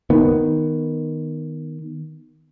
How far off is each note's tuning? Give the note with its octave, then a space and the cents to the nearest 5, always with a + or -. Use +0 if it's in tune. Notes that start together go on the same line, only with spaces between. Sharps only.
D#3 +0 B3 +0